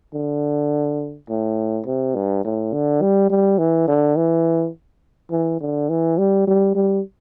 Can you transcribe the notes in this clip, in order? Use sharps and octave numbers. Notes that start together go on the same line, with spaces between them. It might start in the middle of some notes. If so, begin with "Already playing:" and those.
D3
A2
C3
G2
A2
D3
G3
G3
E3
D3
E3
E3
D3
E3
G3
G3
G3